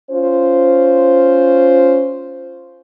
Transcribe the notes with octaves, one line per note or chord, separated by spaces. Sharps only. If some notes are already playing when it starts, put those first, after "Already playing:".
C#4 F4 C5